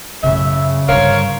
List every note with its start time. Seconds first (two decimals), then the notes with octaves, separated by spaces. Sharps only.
0.23 F#2 A2 C#3 E5
0.88 G2 D3 A#4 C5 C#5 F5